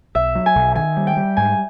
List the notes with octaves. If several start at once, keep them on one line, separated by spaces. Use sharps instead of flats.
B1 E5
F#3
G#5
B1
D#3 G#5
G3
G5
G3
G#2 G#5